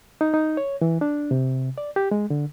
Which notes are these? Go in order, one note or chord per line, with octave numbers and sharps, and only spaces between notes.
D#4
D#4
C#5
E3
D4
C3
D5
G4
G#3
D3